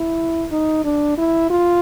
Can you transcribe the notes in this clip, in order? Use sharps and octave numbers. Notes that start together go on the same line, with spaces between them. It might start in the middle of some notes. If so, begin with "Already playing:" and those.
Already playing: E4
D#4
D4
E4
F4